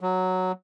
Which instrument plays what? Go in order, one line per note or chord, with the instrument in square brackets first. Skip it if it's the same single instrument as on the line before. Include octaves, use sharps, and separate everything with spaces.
[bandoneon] F#3